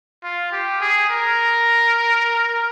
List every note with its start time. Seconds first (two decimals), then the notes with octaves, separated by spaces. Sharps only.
0.24 F4
0.53 G4
0.81 G#4
1.10 A#4